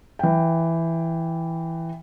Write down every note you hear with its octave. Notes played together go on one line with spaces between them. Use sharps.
E3 G5